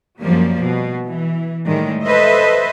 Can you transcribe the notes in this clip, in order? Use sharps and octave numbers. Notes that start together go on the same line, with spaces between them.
F#2 F3 G3 A#3
B2
E3
A2 D#3 G3 G#3
A4 B4 C5 D#5 E5